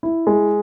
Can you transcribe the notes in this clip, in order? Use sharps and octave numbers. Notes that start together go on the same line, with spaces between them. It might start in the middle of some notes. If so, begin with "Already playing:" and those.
E4
G#3